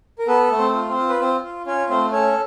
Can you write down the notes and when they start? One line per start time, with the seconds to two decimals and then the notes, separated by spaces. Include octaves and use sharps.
0.19 A#4
0.27 B3 A4 B4
0.51 A3
0.58 C4 C5
0.74 F4
0.89 C4 C5
0.97 F4
1.09 B4
1.20 C4 C5
1.43 F4
1.66 C#4 F4 C#5
1.89 A3 C4 C5
2.12 C#4 A4 C#5